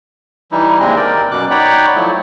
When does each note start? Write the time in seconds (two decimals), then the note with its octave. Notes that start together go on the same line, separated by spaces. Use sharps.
0.52 E3 G3 D#4 E4
0.80 D#2 C3 G#3 C4 D4 D#5
0.96 A#4 D5 G5
1.31 F#2 B2 D6 F#6
1.51 D#4 C#5 D5 F#5 G5 B5
1.95 F3 F#3 A3 E4